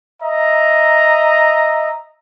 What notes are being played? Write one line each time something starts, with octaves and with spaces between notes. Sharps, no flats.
D#5 E5 A#5